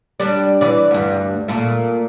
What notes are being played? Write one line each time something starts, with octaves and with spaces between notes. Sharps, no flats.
G3 D4
E3 D5
D2 G2
A#2 A3